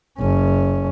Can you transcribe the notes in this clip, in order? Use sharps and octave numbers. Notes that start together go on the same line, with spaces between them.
F#1 C#4